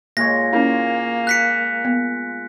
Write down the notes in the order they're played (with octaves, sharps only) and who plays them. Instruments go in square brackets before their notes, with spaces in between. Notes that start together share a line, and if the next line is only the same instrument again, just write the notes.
[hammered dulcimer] A#2 G#3 C#5 [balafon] A#3 [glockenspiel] A#6
[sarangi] A#3 [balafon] C#4 E4
[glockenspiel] F#6 B6 C#7
[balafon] B3